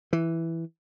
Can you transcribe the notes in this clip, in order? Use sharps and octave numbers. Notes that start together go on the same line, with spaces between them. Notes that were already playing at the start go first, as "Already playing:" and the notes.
E3